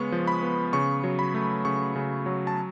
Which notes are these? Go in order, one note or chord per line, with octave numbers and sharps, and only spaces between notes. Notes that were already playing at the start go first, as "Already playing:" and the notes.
Already playing: C#3 G#3 B3 C#6
F3
B5
B3
C#3 C#6
F#3
B5
A3
C#3 C#6
C#3
F#3
A5